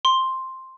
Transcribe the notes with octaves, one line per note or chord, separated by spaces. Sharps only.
C6